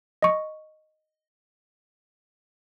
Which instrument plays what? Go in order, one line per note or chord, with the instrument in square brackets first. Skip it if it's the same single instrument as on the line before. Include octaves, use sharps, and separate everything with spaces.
[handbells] D#5 C#6